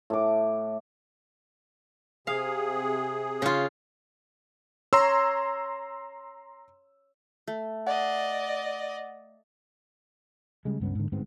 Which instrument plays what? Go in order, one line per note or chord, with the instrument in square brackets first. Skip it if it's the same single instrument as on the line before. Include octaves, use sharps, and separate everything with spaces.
[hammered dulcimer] A2 D6
[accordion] C3 G#4 [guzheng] F5
[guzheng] C#3 F4
[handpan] C#5 [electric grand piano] A#5 C6 E6
[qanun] A3
[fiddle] D5 D#5 [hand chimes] F#5
[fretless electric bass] C#3 G3 G#3
C#2 G2 B3 C#4
G#2 D3
G1 G#2 B3 C4